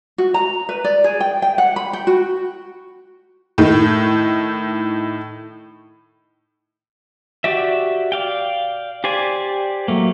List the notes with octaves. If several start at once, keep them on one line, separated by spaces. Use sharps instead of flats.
F#4
A#5
B4
D5
G#4
G5
G5
F#5
B5
G5
F#4
A2 D#3
F#4 G4 D5 E5
D5 F5 G5
G4 C5 D5 G#5
F#3 A3 A#3